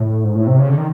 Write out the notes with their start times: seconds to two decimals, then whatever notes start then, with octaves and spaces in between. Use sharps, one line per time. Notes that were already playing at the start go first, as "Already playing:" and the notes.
Already playing: A2
0.24 G#2
0.35 A2
0.47 C3
0.59 C#3
0.69 D3
0.78 D#3